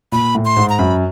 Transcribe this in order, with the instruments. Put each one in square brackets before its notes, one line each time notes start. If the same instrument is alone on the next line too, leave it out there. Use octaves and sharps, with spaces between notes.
[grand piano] A#2 [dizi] B5
[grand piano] A2
[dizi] C6
[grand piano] G#2
[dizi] A#5
[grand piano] F#2 [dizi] B5